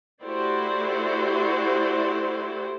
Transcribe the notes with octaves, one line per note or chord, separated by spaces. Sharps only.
A3 E4 F#4 G4 C5 D5